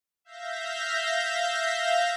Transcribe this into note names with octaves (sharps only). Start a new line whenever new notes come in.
E5 F5 G6 A#6